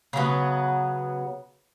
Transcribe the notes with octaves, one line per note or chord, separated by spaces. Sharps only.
C#3 F#3 B3